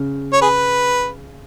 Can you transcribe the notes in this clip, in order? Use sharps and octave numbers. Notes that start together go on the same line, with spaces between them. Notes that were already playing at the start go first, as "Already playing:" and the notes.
Already playing: C#3
C#5
G#4 B4